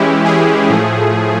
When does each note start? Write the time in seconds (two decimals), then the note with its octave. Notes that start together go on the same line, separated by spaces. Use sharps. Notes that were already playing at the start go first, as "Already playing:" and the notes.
Already playing: E3 G#3 C#4 E4 G4
0.25 G#4
0.69 A2 F3 A3